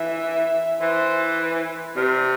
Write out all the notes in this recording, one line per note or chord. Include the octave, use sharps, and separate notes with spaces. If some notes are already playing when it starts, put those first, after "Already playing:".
Already playing: E3 E5
E3 C5
B4
C3 D5